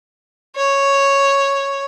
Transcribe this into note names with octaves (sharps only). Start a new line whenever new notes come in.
C#5